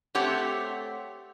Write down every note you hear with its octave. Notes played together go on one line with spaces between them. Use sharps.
A3 C4 G4 C5 C#5 F#5